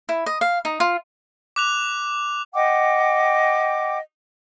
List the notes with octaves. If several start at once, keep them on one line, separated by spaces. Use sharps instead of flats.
E4
D#5
F5
D#4
F4
D6 F#6 F7
D#5 F#5 G5 D6